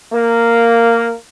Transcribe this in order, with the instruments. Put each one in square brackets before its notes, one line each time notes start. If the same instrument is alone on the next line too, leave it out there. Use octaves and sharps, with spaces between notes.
[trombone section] A#3